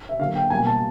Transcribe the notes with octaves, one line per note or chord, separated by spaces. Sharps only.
E5
D3 F#3 A#3 F5
G5
B2 G3 A#3 G#5
A5